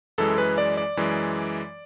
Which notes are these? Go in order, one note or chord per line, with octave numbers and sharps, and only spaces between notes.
F#2 E3 G#3 A4
B4
D5
D5
F#2 E3 G#3